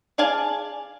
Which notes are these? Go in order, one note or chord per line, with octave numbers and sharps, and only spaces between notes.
G#4 D5 F5 G#5 A5